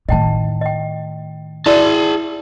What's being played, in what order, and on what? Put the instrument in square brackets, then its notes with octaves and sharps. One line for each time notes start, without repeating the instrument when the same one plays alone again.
[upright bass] A2 D#3 [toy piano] D#5 G5 A5
[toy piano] D#5 G5
[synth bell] E4 [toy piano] F#4 D5 E5 [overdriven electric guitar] G#4 A5